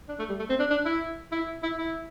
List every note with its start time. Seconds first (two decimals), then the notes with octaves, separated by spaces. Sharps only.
0.09 D4
0.19 A3
0.29 G3
0.39 A3
0.49 C4
0.59 D4
0.70 D4
0.85 E4
1.32 E4
1.63 E4
1.78 E4